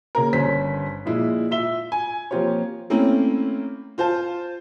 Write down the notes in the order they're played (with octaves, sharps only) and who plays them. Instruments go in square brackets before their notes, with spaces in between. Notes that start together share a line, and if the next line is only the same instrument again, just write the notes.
[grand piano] C#3 A#3 A#4
G1 C#4 C5 B6
A#2 F3 G#3 E4
F4 E5 G7
G#5
F3 A#3 C4 F4 G4 C#5
[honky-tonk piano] A3 A#3 C4 C#4 E4
F4 C5 F5 A5